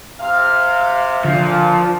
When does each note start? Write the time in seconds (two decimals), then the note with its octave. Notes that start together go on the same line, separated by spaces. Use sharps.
0.20 C3 F5
1.25 A#2 D3 F3